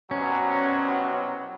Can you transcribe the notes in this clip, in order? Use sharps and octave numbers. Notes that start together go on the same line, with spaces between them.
C2 B2 F#3 C#4